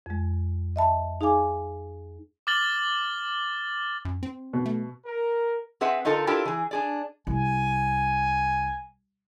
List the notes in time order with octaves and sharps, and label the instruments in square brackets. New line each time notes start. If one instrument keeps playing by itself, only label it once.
[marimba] F2 G#3
D#5 E5 A5 B5
D#4 G#4 F5 G#5 D6
[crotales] D6 F6 A6 F#7 G7
[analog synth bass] F#2
C4
[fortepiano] B2
[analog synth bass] A3
[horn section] A#4
[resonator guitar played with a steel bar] C4 G#4 B4 E5 F#5
D3 D#4 F4 A4 A#4
D4 E4 F4 G4 A4 A#4
E3 G#4
D4 G#4 D5
[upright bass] C2 [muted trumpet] G#5